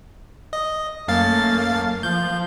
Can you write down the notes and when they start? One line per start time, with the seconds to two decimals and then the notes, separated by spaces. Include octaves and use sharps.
0.53 D#5
1.08 F#2 A3 A#3 F5 A6
2.03 F3 G6